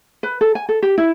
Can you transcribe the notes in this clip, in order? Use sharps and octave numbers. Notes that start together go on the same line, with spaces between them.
B4
A4
G#5
A4
G4
E4